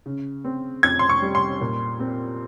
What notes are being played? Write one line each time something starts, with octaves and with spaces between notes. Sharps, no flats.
C#3
C4
F2 G#6
C6
C#6
G3
C6
A#2
C4